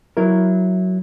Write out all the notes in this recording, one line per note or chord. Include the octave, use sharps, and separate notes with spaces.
F#3 E4 A#4